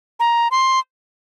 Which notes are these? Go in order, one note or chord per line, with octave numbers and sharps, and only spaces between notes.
A#5
C6